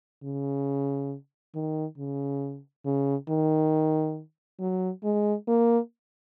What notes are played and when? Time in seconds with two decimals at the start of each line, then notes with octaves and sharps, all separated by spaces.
0.23 C#3
1.55 D#3
1.98 C#3
2.85 C#3
3.29 D#3
4.60 F#3
5.03 G#3
5.48 A#3